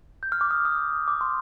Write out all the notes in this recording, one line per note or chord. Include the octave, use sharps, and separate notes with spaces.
G6
F6
D6
D#6
D#6
D6
C6